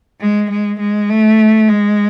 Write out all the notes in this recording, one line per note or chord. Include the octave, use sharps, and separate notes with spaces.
G#3
G#3
G#3
A3
G#3